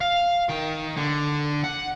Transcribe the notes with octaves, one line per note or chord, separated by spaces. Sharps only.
F5
D#3 G5
D3
F#5